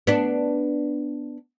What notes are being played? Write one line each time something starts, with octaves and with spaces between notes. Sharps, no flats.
B3 D4